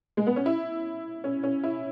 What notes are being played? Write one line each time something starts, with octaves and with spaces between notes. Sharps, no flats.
G#3
B3
C#4
E4
C#4
C#4
E4